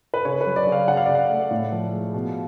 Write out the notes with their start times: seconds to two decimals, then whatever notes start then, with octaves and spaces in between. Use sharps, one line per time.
0.14 B4
0.25 C#3 C#5
0.41 B4
0.46 F#3
0.56 D5
0.67 C#3
0.72 F5
0.88 C#3 F#5
0.97 F5
1.06 C#3 D5
1.15 F5
1.30 A3
1.51 A2
1.72 F3
1.93 G#3
2.14 B2